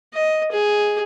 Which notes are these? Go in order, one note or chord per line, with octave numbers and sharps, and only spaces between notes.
D#5
G#4